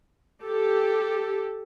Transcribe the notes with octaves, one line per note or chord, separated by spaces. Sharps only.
G4 A4